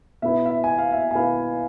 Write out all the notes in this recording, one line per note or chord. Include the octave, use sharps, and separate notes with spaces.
B2 B3 E4 E5
E5
G#5
F5
E5
G#5
B2 B3 E4 F5